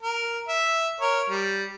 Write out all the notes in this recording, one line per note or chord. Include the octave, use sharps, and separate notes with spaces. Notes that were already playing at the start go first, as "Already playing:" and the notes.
A#4
E5
A#4 C#5
G3